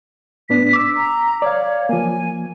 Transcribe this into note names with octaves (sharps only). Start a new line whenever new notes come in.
A2 B3 D4 B6
D6 E6
A#5
C#5 D5 F5
F3 A#3 G#5